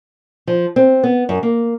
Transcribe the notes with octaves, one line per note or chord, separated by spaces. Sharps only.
F3
C4
B3
F#2
A#3